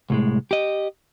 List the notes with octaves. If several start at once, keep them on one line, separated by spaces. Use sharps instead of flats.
C2 A2 G#3
G4 D#5